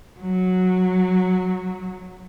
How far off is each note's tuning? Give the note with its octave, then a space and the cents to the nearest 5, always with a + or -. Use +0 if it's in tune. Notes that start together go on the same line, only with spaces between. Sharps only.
F#3 -10